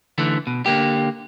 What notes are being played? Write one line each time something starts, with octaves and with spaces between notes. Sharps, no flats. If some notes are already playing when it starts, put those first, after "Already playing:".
D3 E3 A3
B2
D3 A#3 G4